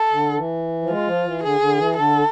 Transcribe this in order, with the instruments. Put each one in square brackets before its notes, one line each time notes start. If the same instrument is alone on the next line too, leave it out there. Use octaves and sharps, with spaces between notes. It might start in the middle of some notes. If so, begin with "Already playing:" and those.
Already playing: [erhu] A4
[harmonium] D3
E3
F3
[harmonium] G#3 [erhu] F4
[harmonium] F3
E3
[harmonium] D3 [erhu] G#4
[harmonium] D3
E3
[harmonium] D3 [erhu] A4